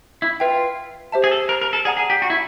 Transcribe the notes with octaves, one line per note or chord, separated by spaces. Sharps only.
E4
F4 B4 E5 G5
G4 C5 E5 A5
G#4
A4
A#4
A#4
A4
G#4 D5 F#5 A#5 D#6
G#4
G4
F#4
E4